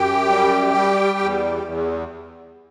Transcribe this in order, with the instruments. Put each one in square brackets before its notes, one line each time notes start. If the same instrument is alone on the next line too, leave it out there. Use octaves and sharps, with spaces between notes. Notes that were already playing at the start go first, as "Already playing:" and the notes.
Already playing: [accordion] F#2 G4 G5
G3
G3
E2
E2